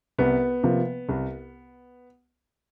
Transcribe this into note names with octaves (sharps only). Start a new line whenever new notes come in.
C2 B3
C3 F3 A#3
C2